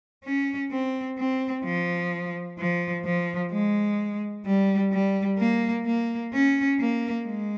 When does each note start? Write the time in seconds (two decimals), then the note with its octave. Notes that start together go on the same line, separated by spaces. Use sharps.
0.25 C#4
0.71 C4
1.18 C4
1.64 F3
2.58 F3
3.05 F3
3.52 G#3
4.46 G3
4.92 G3
5.39 A#3
5.86 A#3
6.33 C#4
6.79 A#3
7.26 G#3